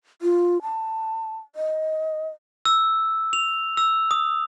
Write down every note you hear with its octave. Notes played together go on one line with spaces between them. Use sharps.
F4
A5
D#5
E6
F7
E6
D#6